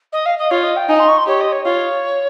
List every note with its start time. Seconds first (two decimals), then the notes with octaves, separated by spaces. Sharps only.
0.12 D#5
0.25 F5
0.37 D#5
0.50 F4 C#5
0.63 D#5
0.76 G5
0.89 D#4 G#5
0.99 C6
1.08 C#6
1.18 C6
1.26 G4 C#5
1.40 D#5
1.52 C#5
1.65 F4 C#5